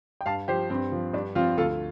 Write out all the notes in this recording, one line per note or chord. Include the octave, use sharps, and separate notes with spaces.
G5
G2 F5 A5
F3 G4 C5
G2 C4
F3
G2 D4
F3 C4 F4
D2 F4 A4